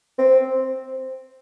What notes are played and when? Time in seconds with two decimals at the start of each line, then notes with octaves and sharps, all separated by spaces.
0.18 C4